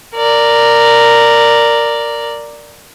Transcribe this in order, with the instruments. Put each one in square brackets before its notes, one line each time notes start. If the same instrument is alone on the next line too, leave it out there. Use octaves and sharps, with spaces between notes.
[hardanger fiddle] A#4 D5